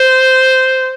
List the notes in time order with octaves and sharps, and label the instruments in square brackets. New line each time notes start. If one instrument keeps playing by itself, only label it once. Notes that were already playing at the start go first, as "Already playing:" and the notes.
Already playing: [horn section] C5